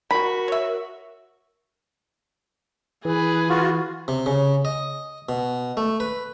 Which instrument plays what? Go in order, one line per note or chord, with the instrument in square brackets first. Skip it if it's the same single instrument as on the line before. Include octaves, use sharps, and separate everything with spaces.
[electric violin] F#4 [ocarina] A#4 [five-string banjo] B5
[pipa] C#5 E5
[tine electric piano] E3 [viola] G#4 B4
[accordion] F4 F#4
[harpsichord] C3
C#3
D#5
B2
A3
B4